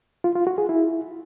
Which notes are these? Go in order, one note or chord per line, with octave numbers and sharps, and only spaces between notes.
F4
F4
F#4
G#4
E4